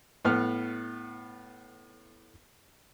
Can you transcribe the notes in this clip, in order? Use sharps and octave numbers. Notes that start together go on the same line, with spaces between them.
A2 B3 F6